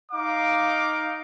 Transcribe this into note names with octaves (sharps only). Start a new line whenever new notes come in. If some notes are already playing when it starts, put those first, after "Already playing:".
D#4 F5 D6